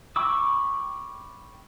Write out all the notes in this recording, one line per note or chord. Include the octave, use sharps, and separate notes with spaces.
G5 B5 C#6 D6 E6